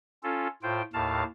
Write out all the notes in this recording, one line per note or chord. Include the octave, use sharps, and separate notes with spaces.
C#4 F4 A4
A2 F4 C5 G5
D#2 A2 F5 A5